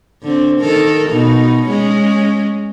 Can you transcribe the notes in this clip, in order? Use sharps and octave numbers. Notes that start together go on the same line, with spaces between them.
D3 C4
D#3 A4 A#4
B2 D#4
G#3 C#4